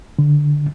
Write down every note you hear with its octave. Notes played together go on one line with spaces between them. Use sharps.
D3